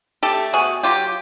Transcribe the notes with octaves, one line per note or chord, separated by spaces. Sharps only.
A3 G4 A4
B2 F#4 G#4
F#3 F4 G4